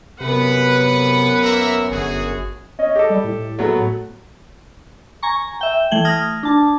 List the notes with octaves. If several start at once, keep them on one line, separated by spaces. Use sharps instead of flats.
F#2 C3 B3 B4 F#5
A#3 A#4 E5
G1 F#4 G#4
C#4 D#5
G4 A4
G3
A2
F#3 A3 B3
G#5 A#5 C#6
E5 G5
E3 A3 G#6 F#7 G7
D#6 F6 G#6 A#6
D4 A5